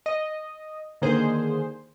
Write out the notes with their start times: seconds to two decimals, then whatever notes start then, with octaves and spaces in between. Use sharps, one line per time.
0.06 D#5
1.02 D3 D#3 A#3 G#4 C5